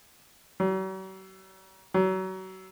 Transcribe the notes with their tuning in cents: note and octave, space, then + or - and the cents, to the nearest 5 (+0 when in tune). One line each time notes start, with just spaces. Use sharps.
F#3 +45
F#3 +30